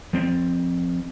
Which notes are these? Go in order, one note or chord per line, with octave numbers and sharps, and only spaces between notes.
F3 C4